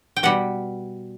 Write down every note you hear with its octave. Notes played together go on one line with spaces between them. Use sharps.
G5
B2 G3 F#5